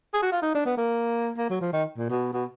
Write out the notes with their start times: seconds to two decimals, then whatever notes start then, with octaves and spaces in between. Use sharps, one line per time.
0.14 G#4
0.23 F#4
0.32 F4
0.42 D#4
0.55 D4
0.65 B3
0.78 A#3
1.37 A#3
1.50 F#3
1.61 F3
1.73 D#3
1.97 A#2
2.09 B2
2.33 B2